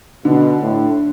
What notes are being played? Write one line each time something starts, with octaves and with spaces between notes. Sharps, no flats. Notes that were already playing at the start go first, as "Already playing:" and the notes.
B2 D3
A2